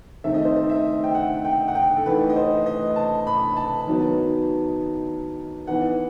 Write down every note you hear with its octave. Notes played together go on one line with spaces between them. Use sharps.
D#3 A3 C4 E5
D#5
C5
D#5
E5
G5
F#5
G5
F#5
G5
A4
E3 A3 D#4 B4
D#5
C5
D#5
A5
B5
A5
D#3 F#3 B3 D#4
E3 B3 D#4 F#5